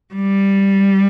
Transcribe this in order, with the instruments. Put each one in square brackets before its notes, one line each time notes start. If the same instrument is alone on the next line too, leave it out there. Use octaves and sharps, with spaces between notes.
[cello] G3